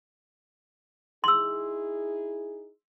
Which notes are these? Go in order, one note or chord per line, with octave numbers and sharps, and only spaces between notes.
D#4 E4 G#4 C6 E6